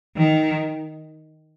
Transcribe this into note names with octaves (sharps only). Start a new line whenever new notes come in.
D#3